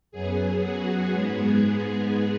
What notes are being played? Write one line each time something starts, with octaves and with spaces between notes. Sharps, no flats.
F#2 F#3 B3 G#4
F#4
G#2 G#3 B3 G#4